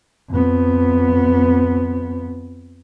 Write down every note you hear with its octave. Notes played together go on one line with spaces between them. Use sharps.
F2 B3